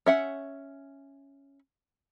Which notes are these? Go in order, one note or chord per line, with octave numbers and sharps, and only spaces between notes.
C#4 E5 F#5